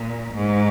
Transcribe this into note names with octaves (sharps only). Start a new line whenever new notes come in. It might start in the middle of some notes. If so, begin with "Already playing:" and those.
Already playing: A#2
G#2